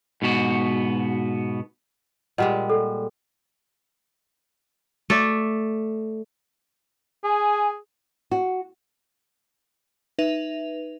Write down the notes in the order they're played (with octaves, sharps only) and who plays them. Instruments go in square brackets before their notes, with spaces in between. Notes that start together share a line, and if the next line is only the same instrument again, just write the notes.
[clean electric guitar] G#2 B2 B3 F#4
[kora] A#2 G3 G#3 [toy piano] D#5 F#5 A#5
[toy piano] A4
[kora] A3 D5
[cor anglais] G#4 [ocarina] G#5
[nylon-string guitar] F#4
[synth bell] D#4 B4 E5 F7